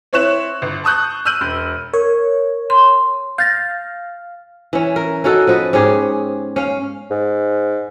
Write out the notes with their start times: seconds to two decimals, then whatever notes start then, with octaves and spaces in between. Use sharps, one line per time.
0.13 C4 E4 C#5 F#6 E7
0.62 G1
0.84 A5 C#6 D#6 F#6 G6
1.25 E6 F6 G6 D#7 F#7
1.41 E1
1.94 A#4 C#5
2.70 C6
3.38 F5 G6 A6 A#6
4.73 E3 C#4
4.96 A#4
5.24 C#4 D#4 F#4 A4
5.47 F3 B3 B4 D#5
5.73 G#2 C#4 G4 G#4
6.56 C#4 F5
7.11 G#2